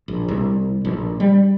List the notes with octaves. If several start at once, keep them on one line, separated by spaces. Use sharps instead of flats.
A#1
C2
A#1
G3